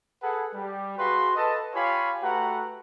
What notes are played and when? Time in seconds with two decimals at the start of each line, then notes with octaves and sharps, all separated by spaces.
0.22 G#4 A4 B4 F#5
0.54 G3 G4
0.98 F#4 G#4 B4 F5 C6
1.36 A4 B4 D#5 A5
1.74 F4 G4 C#5 F5 G#5 B5
2.22 A3 F#4 G4 B4 F#5 A#5